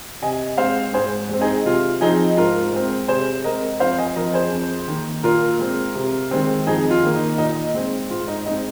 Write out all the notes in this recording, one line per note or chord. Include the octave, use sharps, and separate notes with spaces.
C3 D#5 G#5
G#3 C4 C5 F5
G#2 G#4 C5
G#3 C4
D#4 G#4
C3 F4
F3 C4 D#4 G#4
G#2 F4 A#4
G#3 C4
C3 G#4 C5
G#3 C4 A#4 D#5
F2 C5 F5
D#5 G#5
F3 C4 A#4 D#5
G#4 C5
F2
D#3 A#3
A#2 F4 A#4
G#3 C4
C3
D#3 G#3 C4
F2 D#4 G#4
F4
D#3 A#3
D#4
A#2 D#4
G#3 C4
G#2 F4
D#4
G#3 C4 D#4